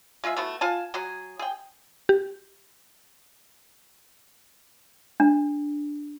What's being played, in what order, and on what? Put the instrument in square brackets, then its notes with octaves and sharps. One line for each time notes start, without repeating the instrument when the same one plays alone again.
[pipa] G#3 F4 G#4 E5
A3 B3 E4 F#4
F4 G#5 A5
F#3 F#4 G#4
G#4 G5
[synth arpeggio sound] G4
[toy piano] D4